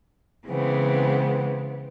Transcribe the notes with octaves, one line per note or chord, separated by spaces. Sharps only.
C#3 E3 G#3 B3 C4